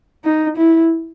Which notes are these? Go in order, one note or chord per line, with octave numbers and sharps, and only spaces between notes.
D#4
E4